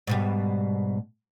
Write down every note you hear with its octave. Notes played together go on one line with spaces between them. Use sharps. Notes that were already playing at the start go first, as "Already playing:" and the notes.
G#2 B2 G3